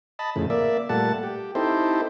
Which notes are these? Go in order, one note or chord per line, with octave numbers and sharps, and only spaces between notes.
D#5 A5 B5
F2 A2 C#3
A#3 D5 E5
A#2 G3 A3 F#5 A5
G4
C4 D#4 E4 G4 A4 C5